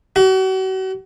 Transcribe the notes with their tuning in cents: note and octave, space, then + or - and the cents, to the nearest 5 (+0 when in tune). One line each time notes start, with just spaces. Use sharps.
F#4 +40